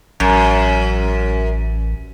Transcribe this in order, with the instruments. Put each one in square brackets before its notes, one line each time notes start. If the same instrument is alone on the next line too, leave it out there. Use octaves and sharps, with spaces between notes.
[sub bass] A1 [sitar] F#2